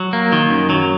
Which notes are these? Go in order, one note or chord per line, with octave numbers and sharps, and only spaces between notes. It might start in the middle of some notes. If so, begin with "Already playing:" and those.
Already playing: F#3
A#3
D#3
F#2
F#3